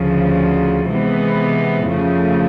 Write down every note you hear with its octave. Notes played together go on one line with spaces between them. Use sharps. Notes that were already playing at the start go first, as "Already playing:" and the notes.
Already playing: D2 C#3 F3
C3 E3 G#3 B3
F2 C#3 F3 A3